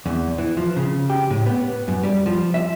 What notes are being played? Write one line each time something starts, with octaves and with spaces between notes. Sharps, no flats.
E2
E3
F3
C#3
G4
A2
B3
F#2
G3
F3
E5